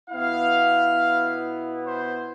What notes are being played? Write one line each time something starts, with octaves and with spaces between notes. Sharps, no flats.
B2 B3 E4 F5
C5